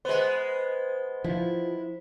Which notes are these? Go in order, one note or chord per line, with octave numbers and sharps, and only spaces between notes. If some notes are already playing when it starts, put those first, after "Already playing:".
G#3 B3 C5
F3 E4